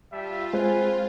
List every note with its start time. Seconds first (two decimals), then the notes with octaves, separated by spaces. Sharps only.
0.13 G3 F4 E5 A5
0.54 G#3 C4 B4 G#5